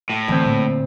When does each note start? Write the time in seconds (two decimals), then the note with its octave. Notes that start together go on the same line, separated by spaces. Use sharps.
0.10 A2
0.28 D2 E3 C4
0.45 A#2